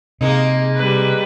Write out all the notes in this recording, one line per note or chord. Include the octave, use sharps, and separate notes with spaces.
C3 G#3 A#3 D#4
G3 B4